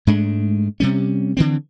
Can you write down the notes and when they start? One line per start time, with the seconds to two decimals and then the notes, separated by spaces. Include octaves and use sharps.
0.07 G#2 G#3 A3 D4
0.80 C3 G3 C#4
1.37 D3 E3 C4